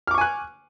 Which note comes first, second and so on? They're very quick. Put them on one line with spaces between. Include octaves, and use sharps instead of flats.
F6 D6 C#6 G#5 F#6